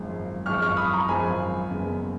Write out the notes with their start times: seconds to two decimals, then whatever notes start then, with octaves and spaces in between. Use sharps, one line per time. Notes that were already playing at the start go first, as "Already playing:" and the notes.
Already playing: G#1 F#2 F3 G#3
0.46 G#1 F#2 F3 G#3 C#6 F6
0.62 C#6 F6
0.77 B5 D#6
0.93 A#5 C#6
1.08 G#1 F#2 F3 G#3 G#5 B5
1.70 F#1 F#2 C#3 G#3 B3